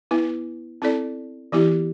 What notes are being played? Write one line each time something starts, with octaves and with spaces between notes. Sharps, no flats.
B3 E4 B4
C4 E4 A4 D5
E3 B3 E4 G4